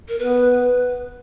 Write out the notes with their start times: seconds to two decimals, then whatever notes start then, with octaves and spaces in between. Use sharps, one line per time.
0.09 A#4
0.18 B3 B4